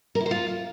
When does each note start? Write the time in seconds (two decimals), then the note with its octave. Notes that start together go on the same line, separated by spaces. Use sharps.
0.15 A#4
0.20 E4
0.26 C5
0.31 F4